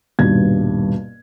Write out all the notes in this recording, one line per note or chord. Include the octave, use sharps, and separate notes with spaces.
D#1 G2 B2 G#6